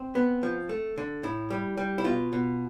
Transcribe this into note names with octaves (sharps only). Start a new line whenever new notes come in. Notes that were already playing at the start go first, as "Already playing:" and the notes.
Already playing: C4
B3
F3
A3
D3
A2 E4
G3
G3
E4
B2 F4
B2